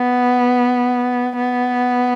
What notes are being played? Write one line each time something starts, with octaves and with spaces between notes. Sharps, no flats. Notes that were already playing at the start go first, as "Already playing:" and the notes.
Already playing: B3
B3